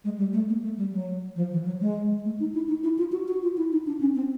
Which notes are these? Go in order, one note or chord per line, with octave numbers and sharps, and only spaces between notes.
G#3
G3
A3
A#3
A3
G3
F#3
F3
E3
F#3
G#3
A3
D#4
E4
D#4
E4
F4
F#4
F#4
F4
E4
D#4
D4
C#4
C4